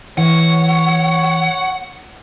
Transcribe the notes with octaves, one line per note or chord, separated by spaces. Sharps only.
E3 C#5 F#5